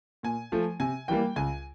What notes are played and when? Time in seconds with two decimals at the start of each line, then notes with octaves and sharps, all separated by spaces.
0.23 A#2 G#5
0.52 F3 A3
0.80 C3 G#5
1.08 E3 G3 A#3 G5
1.36 C#2 G#5